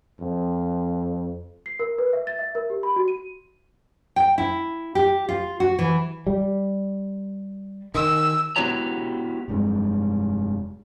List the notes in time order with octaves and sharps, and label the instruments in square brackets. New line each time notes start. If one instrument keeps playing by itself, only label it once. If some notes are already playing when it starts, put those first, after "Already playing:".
[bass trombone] F2
[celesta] C7
A#4
B4
E5
A6
E5
A#4
G4
B5
F#4
D#7
[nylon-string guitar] G5
E4
G4
F4
F#4
E3
[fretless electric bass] G3
[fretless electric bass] D#3 [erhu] E6
[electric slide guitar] B3 E4 F#4 G4 C#5 A#5
[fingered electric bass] F1 G2 C3 G#3